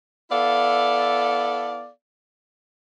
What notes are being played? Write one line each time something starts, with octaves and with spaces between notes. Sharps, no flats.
B3 E4 A4 D5 F5